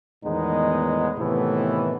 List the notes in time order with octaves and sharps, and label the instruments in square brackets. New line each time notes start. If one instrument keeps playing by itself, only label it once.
[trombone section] E2 A2 D#3 G#3 B3 D#4
A2 C3 D#3 E3 A3 B3